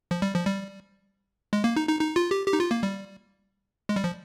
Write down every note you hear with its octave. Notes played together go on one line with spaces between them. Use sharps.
F3
G3
F3
G3
G#3
A#3
D#4
D#4
D#4
F4
G4
G4
D#4
F4
A#3
G3
G#3
G3
F3